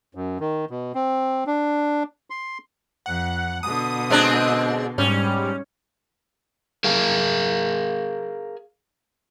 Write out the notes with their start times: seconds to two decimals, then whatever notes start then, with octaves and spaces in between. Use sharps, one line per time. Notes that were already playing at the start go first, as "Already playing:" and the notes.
0.15 F#2
0.40 D#3
0.70 B2
0.95 C4
1.47 D4
2.30 C6
3.06 F2 F#5
3.63 B2 D3 D#6
4.10 G#3 C4 D4
4.98 G#2 G3 C#4
6.84 G#4 A#4 F5